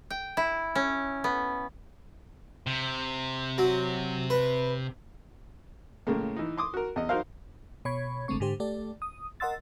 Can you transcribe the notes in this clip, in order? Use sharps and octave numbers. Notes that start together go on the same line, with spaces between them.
G5
E4
C#4
B3
C3
F#3
B4
A2 C#3 G#3 A#3
E3 D#4
C6 D6 D#6
F#4 A#4
E2 D#5
D#4 F#4 A#4 C5 F5
B2 C#5 B5 C#6 G#6
G#1 D3 G#3 A3 C4 C#6
G#2 D3 G4 C5
A3 G4 A4 D5
D#6
A#4 D#5 F#5 C6 E6 A6